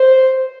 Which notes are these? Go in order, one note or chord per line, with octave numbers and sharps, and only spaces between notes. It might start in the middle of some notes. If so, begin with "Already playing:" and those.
Already playing: C5